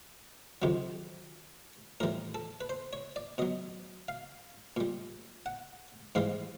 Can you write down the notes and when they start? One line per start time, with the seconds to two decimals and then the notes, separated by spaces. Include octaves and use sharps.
0.62 F2 C3 D#3 F#3
2.00 A2 E3 G3 A#4
2.35 A4
2.61 B4
2.69 C5
2.93 C#5
3.16 D5
3.38 B2 F#3 D#5
4.08 F5
4.77 A#2 G3
5.46 F#5
6.15 G#2 E3 G3 F5